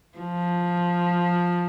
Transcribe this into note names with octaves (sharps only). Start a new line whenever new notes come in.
F3